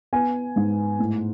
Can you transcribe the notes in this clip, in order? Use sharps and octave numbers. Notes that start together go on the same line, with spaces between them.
B3 G#5
G#2
A2